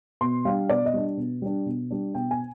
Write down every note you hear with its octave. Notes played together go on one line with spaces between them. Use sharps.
B2 C6
G3 D4 F5
B2 D5
D#5
G3 D4
B2
G3 D4
B2
G3 D4
B2 G5
G#5